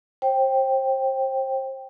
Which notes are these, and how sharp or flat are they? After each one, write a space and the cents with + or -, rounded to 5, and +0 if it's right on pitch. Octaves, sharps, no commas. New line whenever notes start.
C5 +30 G5 +0